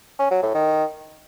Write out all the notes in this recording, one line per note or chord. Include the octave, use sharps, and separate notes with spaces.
C#4
F#3
A2
D#3